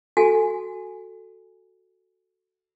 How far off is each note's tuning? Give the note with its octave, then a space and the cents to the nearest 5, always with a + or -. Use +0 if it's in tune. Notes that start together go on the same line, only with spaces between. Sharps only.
F#4 +0 A4 +0 G#5 +0